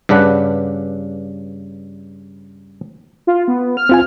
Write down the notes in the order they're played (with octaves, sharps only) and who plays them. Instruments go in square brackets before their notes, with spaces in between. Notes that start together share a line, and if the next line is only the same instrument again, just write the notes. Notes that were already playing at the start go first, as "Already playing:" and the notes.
[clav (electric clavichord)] G2 C#3 D4 B4 F#5
[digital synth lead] F4
B3
F6
[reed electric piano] C4 F4 G#5